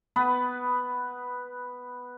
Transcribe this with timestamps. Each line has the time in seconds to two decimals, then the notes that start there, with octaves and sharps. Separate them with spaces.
0.16 B3 B4